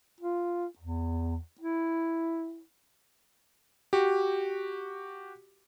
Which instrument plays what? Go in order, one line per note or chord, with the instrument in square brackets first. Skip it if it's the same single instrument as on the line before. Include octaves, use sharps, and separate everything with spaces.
[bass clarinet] F4
E2
E4
[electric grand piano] F#4 G4